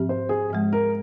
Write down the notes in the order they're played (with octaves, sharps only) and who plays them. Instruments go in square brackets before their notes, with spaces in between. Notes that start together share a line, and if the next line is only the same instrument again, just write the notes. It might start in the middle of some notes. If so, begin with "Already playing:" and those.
Already playing: [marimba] G#2 F3 C4 G4
[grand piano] C5
G#4
[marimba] G#2 F3 G#3
[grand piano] A#4